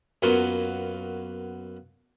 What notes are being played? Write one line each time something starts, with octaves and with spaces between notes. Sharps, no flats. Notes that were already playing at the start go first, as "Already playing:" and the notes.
F#2 F#3 A#3 B3 F4